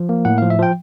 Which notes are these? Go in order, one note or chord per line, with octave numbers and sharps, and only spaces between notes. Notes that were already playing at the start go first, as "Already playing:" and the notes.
Already playing: F3
A#3
A2 F#5
F3 F5
E5
F3 G5